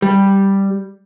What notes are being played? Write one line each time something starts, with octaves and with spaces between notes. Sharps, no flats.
G3